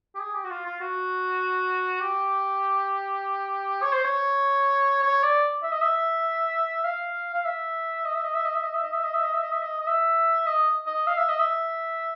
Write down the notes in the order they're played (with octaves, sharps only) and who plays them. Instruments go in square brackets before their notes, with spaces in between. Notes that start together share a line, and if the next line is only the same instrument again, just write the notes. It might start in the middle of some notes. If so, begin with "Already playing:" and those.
[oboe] G4
G#4
G4
F#4
F4
F4
F#4
G4
C#5
C5
C#5
C#5
D5
E5
D#5
E5
F5
F5
E5
D#5
E5
D#5
E5
D#5
E5
D#5
E5
D#5
E5
D#5
E5
D#5
E5
D#5
E5
D#5
D#5
E5
D#5
D#5
F5
E5
D#5
E5